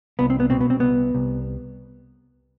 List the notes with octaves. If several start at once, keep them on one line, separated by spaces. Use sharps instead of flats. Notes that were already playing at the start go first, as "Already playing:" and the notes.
C2 B3
C4
B3
B2 C4
B3
C4
C2 B3
C2